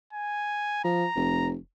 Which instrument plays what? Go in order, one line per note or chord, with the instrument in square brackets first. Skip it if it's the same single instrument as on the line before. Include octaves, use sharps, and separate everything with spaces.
[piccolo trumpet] G#5
[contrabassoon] F3 [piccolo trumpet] A#5
[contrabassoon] F1